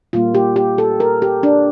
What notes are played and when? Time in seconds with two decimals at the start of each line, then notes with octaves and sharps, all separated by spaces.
0.13 A#2 G3 A#3 F4
0.35 G4
0.56 G4
0.78 A4
1.00 A#4
1.22 G4
1.43 D4